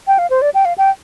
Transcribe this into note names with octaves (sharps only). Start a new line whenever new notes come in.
G5
F5
C5
D5
G5
F5
G5